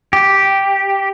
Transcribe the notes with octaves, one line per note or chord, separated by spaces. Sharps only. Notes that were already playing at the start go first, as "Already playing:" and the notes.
G4